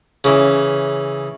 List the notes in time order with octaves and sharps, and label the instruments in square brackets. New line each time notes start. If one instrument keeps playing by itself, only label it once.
[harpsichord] C#3 E3